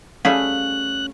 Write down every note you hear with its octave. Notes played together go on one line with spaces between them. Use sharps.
G3 A3 C#4 G#4 F5 F#6